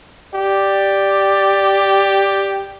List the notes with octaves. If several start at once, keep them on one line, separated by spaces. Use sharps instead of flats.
G4 D5